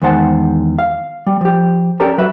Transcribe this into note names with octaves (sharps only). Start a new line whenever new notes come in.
E2 D#3 G#3 C5 F#5 A5
F5
G3
F3 G4
C#4 G4 A4 A#4 D5 A#5
F#3 B4 E5